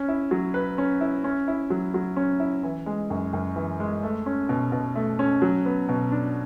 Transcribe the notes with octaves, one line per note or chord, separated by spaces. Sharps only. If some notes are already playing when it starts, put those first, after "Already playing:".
Already playing: C#4
E4
F#3
B4
C#4
E4
C#4
E4
F#3
F#3
C#4
E4
E3
G#3
F#2
F#2
E3
G#3
A3
C#4
B2
B2
A3
C#4
F#3
B3
B2
D4